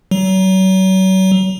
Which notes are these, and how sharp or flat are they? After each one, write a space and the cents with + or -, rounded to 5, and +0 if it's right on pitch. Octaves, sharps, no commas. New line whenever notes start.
F#3 +35